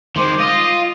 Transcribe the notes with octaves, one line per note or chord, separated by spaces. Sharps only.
D#3 G#3 C5 C6 D6
F4 D#5 D#6